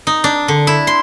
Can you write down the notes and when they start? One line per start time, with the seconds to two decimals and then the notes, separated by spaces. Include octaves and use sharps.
0.07 D#4
0.24 D4
0.48 D3
0.67 E4
0.87 C6